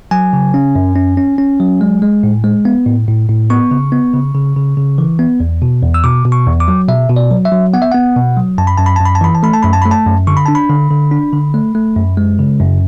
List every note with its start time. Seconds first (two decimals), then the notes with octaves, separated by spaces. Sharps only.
0.11 F#3 G#5
0.33 C#3
0.54 C#4
0.75 F#2
0.96 C#4
1.17 C#4
1.38 C#4
1.60 F#3
1.81 G#3
2.02 G#3
2.23 A2
2.44 G#3
2.65 B3
2.86 A2
3.08 A2
3.29 A2
3.50 B3 C#6
3.71 C#3
3.92 B3
4.14 C#3
4.34 C#3
4.56 C#3
4.77 C#3
4.98 E3
5.19 B3
5.40 E2
5.62 B2
5.83 E2
5.94 E6
6.04 B2 D6
6.25 B2
6.32 C#6
6.47 E2
6.60 D6
6.68 F#3
6.88 B2 E5
7.09 B2
7.16 D5
7.31 F#3
7.45 E5
7.52 F#3
7.73 B3 F#5
7.82 E5
7.92 B3 F#5
8.16 B2
8.37 F#3
8.58 F#2 A5
8.67 B5
8.78 F#2 A5
8.86 B5
8.96 F#2 A5
9.05 B5
9.15 A5
9.21 E3 B5
9.35 A5
9.43 A3 B5
9.53 A5
9.63 F#2 B5
9.73 A5
9.82 A3 B5
9.91 A5
10.06 F#2
10.27 D3 C#6
10.37 B5
10.46 D4 A5
10.55 B5
10.69 D3
10.91 D3
11.11 D4
11.33 D3
11.54 A3
11.75 A3
11.96 F#2
12.17 G#3
12.39 C#3
12.60 F#2